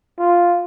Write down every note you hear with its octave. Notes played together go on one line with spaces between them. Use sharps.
F4